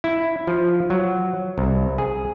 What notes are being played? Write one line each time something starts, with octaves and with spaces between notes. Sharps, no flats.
E4
F3
F#3
C2
G#4